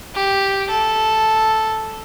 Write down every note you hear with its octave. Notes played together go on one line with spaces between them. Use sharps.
G4
A4